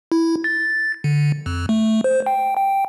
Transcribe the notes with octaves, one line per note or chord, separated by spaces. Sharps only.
E4
A6
D3
F2
A3
C5
G5
G5